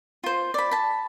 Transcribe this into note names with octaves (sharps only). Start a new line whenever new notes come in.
F4 C5
D5 B5
A5 B5